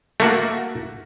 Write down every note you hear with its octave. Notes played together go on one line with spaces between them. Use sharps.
A3 A#3 F#4